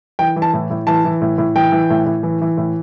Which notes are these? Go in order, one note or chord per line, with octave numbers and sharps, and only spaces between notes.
E3 G5
E3
A5
A2
A2
E3 A5
E3
A2
A2
E3 G5
E3
A2
A2
E3
E3
A2